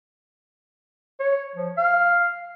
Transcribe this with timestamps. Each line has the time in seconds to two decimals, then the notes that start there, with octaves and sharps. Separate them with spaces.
1.20 C#5
1.56 F3
1.78 F5